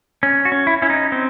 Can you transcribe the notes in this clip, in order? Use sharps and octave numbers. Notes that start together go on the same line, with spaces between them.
C#4
F#4
C#4
E4
C#4 E4
D#4
C4